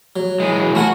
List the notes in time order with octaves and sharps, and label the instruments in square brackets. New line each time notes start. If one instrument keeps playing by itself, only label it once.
[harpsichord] F#3
[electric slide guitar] E3 G#3
[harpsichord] A3 A#4 G#5 [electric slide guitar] F#4 F#5